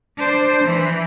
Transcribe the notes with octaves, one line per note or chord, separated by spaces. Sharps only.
D4 C5
E3